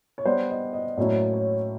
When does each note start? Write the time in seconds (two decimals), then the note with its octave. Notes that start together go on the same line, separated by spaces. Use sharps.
0.18 C#5
0.25 G3 B3 D4 C5
0.50 D#5
0.73 D#5
0.97 A2 F#3 A#3 C#4 E4 D5
1.33 C#5